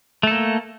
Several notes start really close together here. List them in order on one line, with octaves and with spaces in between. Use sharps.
A3 A4 A#3